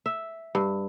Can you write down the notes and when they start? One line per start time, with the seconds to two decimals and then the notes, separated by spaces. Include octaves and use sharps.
0.06 E5
0.55 G2